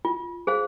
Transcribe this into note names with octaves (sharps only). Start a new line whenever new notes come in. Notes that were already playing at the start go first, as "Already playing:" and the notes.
F4
G#4 C5 F5